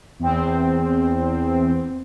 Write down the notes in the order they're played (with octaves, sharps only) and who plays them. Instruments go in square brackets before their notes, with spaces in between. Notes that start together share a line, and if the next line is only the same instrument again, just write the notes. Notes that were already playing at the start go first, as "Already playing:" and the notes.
[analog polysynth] E2 C4